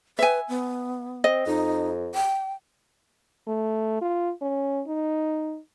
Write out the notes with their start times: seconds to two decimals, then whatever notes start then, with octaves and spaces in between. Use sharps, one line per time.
0.19 B4 E5 G#5
0.48 B3
1.24 C4 D#5
1.47 F2 D#4
2.15 G5
3.47 A3
4.02 F4
4.42 C#4
4.87 D#4